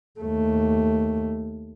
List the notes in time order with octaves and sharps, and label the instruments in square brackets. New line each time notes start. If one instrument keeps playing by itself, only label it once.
[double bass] D#2 A3